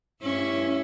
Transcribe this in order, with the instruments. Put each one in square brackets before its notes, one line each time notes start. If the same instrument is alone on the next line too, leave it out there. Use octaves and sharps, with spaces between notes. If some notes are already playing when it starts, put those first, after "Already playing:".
[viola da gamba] G2 C#4 E4